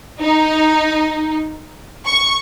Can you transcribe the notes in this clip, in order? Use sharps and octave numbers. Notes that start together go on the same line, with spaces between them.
D#4
C#6